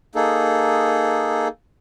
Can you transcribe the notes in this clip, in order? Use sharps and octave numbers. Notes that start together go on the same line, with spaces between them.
A#3 D#4 G#4 A4